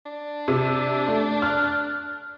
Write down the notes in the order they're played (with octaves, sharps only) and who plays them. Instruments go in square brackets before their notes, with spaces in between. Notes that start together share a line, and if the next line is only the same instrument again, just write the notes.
[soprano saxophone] D4
[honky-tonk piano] C3
A3
F6 F#6